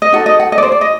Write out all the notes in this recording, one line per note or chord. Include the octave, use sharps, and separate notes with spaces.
D#5
D#4 F#4 A4 F#5
D#5
F#5
D#5
D5
C5
D5
D#5